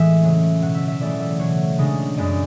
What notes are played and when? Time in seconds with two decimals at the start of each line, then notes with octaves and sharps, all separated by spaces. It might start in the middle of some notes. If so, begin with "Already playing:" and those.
Already playing: A2 E3 G#3 E5
0.23 C#3 F#3 C#4
0.61 B2 F#3 C#4 F#5
0.75 E5
0.88 E5
1.00 C#3 E3 A3 D5
1.20 E5
1.39 B2 F#3 A3 C#5
1.78 C#3 G#3 D4
2.17 F#2 C#3 G#3 C#4 D5